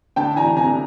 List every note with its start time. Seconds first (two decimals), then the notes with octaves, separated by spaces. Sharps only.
0.16 D2 G5 A5
0.36 E3 G#5 A#5
0.57 C3 G#5 A#5